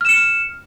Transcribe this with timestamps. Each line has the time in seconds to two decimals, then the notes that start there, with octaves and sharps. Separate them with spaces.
0.01 F6
0.05 E7
0.09 C#7